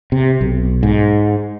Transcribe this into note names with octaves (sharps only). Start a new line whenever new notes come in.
C3
B1
G#2